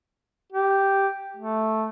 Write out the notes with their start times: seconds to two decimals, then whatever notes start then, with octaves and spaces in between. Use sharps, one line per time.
0.52 G4
1.37 A3